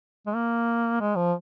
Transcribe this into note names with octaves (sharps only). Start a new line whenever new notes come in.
G#3
A#3
G#3
F3